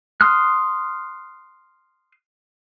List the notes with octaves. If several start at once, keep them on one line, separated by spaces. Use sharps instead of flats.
C6 D#6 F6 F#6